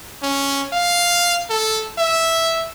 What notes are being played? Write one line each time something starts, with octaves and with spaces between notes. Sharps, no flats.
C#4
F5
A4
E5